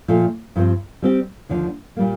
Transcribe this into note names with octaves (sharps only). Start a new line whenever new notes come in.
A#2 F3 A3
G2 F3 C4
G3 C4 G4
D#2 D3 F3
A#2 G3 A#3